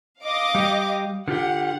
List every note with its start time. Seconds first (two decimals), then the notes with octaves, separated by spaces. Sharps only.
0.23 D#5 F5 D6
0.55 G3 G4
1.28 D3 F4 G4 F#5